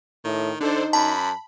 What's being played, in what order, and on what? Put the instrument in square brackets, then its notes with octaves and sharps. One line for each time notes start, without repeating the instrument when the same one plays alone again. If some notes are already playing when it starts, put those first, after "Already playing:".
[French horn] A2 [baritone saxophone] D#3
[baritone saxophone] D3 [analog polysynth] D4 A4 C5 [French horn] D#4
[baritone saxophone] F#2 [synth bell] A5 [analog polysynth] B5